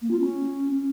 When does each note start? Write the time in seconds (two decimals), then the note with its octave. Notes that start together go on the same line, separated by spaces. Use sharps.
0.02 A#3
0.11 F4
0.20 C#4